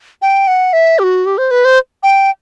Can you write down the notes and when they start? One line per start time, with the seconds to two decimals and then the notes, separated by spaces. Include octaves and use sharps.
0.22 G5
0.48 F#5
0.73 E5
0.99 G4
1.03 F#4
1.26 G4
1.38 C5
1.51 B4
1.65 C5
2.03 G5